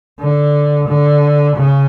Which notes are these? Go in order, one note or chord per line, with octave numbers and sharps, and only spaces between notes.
D3
D3
C#3